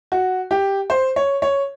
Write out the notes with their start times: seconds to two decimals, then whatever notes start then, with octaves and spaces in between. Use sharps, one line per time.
0.12 F#4
0.51 G4
0.90 C5
1.16 C#5
1.42 C#5